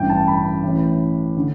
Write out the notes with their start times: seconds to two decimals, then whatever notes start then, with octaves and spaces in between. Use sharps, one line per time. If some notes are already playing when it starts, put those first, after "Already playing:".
Already playing: A1 G2 E3 G5
0.10 A5
0.28 B5
0.63 A1 A2 E3
1.37 D3